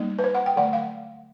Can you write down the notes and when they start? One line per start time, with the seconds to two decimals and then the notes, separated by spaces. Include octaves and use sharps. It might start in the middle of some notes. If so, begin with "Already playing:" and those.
Already playing: G3 A#3 D#4
0.19 B4
0.24 C5
0.35 F#5
0.46 G5
0.56 D3 F#3 A3 F#5
0.73 F5